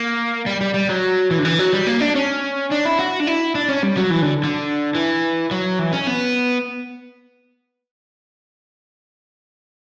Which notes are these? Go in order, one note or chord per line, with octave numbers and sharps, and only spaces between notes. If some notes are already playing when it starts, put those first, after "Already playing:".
Already playing: A#3
G3
G3
G3
F#3
E3
D3
E3
F#3
G3
A#3
D4
C#4
D4
E4
F#4
D4
E4
D4
C#4
G3
F#3
E3
D3
D3
E3
F#3
E3
C#4
B3